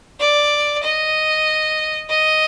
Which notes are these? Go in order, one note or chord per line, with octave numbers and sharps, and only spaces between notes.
D5
D#5
D#5